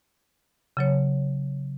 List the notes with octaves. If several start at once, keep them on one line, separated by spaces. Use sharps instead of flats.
C#3 F#3 C#5